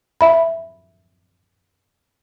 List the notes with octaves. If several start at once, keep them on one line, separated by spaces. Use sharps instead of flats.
E5 B5